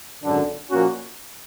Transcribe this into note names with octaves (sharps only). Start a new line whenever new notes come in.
G#1 F#2 D3
A#2 F3 A#3 C#4 F#4